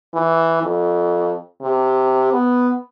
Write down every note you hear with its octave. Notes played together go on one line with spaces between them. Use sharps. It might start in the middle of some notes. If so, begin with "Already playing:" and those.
E3
F2
C3
B3